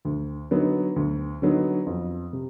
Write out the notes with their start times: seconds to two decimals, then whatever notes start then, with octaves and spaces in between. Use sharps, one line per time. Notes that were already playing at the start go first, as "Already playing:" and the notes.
0.05 D2
0.51 D3 F#3 B3 D#4
0.96 D2
1.42 D3 F#3 B3 D#4
1.86 F2
2.33 C3